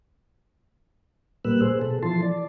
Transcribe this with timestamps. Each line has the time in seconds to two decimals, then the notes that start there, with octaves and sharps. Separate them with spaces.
1.45 A#2 G3 A#3 B4 E6 F#6
1.62 G#4 C5
1.82 B2 A4
2.03 E3 F3 A5 C6
2.23 D5